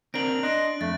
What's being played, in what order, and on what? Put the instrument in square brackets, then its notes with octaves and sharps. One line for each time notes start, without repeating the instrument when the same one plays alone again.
[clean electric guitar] C4 D4 A#4 [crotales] D7 F#7
[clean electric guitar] D4 [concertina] D#5 C6 [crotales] F#6 D7
[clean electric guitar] F2 [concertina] A3 [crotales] A6